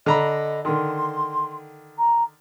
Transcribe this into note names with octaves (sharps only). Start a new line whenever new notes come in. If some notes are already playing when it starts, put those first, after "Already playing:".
D3 D#5 A#5 B5
D3 D#3 C6
A#5